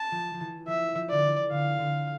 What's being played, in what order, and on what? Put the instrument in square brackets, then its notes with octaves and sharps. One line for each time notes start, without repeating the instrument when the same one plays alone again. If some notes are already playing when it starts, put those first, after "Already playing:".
Already playing: [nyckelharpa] A5
[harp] F3
F3
E3
[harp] F3 [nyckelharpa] E5
[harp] F3
[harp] D3 [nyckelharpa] D5
[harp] E3
[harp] D3 [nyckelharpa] F5
[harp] D3